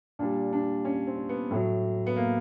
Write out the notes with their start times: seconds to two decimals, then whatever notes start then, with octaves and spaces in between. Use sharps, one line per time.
0.19 A#2 G3 D4
0.53 D4
0.85 C#4
1.07 C4
1.29 B3
1.51 A2 F#3
2.07 B3
2.16 A#3